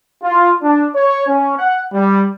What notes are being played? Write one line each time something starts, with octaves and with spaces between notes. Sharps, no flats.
F4
D4
C#5
C#4
F#5
G3